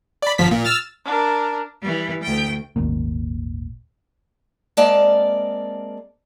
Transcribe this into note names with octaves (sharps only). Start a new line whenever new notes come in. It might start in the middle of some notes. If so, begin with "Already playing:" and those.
D5 B5
G1 F3 B6
A#2
E6 F6 A6
D4 A#4
E3 G3
D2 G5
D#1 G#1 A#2
G#3 A#3 C4 D5 F5 A5